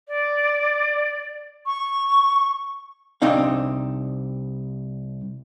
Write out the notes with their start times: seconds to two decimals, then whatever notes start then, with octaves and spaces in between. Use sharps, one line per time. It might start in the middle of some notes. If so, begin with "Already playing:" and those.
0.08 D5
1.66 C#6
3.22 C2 C4 D4 D#4 F5